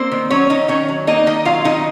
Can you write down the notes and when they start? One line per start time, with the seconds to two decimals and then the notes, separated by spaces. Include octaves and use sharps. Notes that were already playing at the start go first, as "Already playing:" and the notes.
Already playing: A#3 C4 C5
0.11 D#3
0.30 F#3 C#4 C#5
0.49 D#3 D#4 D#5
0.68 D#3 C#4 C#5
0.88 F#3
1.07 A#3 D#4 D#5
1.27 D#3 D#4 D#5
1.45 F#3 F4 F5
1.65 D#3 D#4 D#5